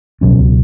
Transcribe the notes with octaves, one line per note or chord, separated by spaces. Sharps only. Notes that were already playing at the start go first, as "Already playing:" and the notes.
C#2 B2 F#3 C#4